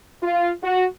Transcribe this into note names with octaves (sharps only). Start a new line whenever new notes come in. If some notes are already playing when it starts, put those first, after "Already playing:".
F4
F#4